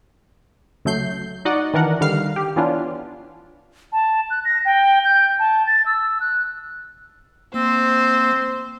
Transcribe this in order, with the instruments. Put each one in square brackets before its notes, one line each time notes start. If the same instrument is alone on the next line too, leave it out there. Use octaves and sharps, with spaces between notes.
[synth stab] C#2 F#3 A3 G6 C7
D#4 F#4 D5 D#5 F#5
D#3 E3 D4 A#4 F#5
D3 D#3 G3 F5 F6 C7
G4
E3 B3 C#4 D4 F4
[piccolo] A5
F#6
A#6
G5
G6
A5
A6
E6
F#6
[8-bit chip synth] A#3 [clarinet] C4 [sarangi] C5